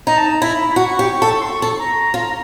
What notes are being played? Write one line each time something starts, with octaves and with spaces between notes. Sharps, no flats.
D#4 A#5
A5
A#5
E4 B5
F#4 C#6
G4
A4
C6
C#6
A4
A#5
F4